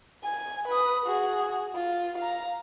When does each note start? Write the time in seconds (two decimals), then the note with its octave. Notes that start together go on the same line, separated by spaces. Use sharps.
0.24 G#5
0.68 B4 D#6
1.06 F#4 G#4
1.75 F4
2.18 F5 A#5